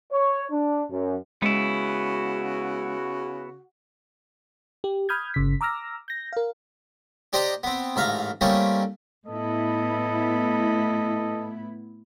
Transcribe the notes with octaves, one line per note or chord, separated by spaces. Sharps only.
C#5
D4
F#2
C#3 G#3 B3 E4 F#4
G4
B5 D#6 F6 G6 G#6
G1 C#3 B6
A#5 D6 E6 F6 A#6
G6 A#6
A#4 F5
D4 G4 C5 D#5 G5 A#5
B3 C4
A1 G#2 E5 F5 A#5
G3 A3 A#3 C4 C#4 D#4
A2 B3 E4 A4 D#5